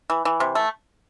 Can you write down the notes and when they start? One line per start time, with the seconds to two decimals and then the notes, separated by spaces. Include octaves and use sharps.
0.10 E3
0.25 E3
0.40 C3
0.55 A3